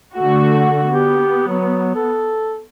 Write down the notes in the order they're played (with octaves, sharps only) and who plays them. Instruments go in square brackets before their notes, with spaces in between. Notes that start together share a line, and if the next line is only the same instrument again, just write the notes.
[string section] D3 A3 F#4
[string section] B3 [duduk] G4
[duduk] F#3
A4